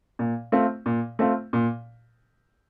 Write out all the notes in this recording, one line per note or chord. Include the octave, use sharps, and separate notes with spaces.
A#2
A3 C4 F4
A#2
A3 C4 F4
A#2